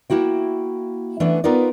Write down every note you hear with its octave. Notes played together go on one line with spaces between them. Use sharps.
A#3 E4 F#4 G5
E3 A3 B3 C#4 D4
B3 D#4 F4 A#4 B4 D5